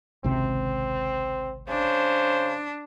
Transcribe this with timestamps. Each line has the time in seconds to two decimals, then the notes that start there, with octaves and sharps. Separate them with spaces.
0.24 G#1 C#2 C3 C4
1.68 C#3 D4 C5